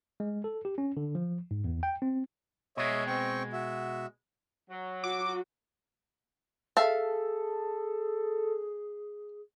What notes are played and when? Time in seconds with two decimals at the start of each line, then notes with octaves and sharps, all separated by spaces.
0.20 G#3
0.44 A4
0.65 G4
0.78 C#4
0.97 D3
1.15 F3
1.51 G#2
1.64 E2
1.83 G5
2.02 C4
2.77 B2 G#3 C#5 D#5 E5
3.07 C4 G5 C#6
3.53 F#4 E5
4.70 F#3
5.04 F#4 D6
6.77 G#4 A4 E5 F5 A5